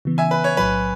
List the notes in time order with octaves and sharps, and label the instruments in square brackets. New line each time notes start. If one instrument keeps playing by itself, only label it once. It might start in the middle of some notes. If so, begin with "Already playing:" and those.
[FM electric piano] C#3 E3 B3
[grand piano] E5 G#5
B4
C#5
[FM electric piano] B1 A2 F#3 [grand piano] B4